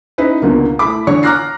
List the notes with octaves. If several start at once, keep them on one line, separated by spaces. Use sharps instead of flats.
C#4 D#4 E4 B4
C#2 B2 D3 A#3
A3 E4 B5 D6
D3 E3 C#5 C#6
A#5 D6 F6 F#6 A#6 C7